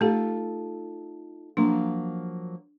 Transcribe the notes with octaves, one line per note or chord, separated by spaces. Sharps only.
A3 D#4 F4 G4 A4
F3 F#3 A#3 D4